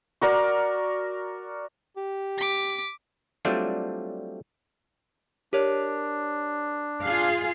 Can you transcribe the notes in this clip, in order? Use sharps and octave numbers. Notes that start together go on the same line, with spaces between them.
F#4 A#4 D5
G4
D6 B6
F#3 G3 A3 C4 D4 F4
D4 G4 A#4 C#5
F4 G#4 F5